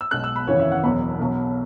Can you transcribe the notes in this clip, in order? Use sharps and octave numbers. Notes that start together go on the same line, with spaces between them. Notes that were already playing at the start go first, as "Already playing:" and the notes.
E6
B1 B2 G#3 F#6
E6
B5
G#1 F#2 C#3 E3 C#5
E5
F#5
E1 E2 B2 F#3 B5
B1 B2 F#3